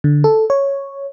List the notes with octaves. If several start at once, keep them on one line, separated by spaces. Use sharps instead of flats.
D3
A4
C#5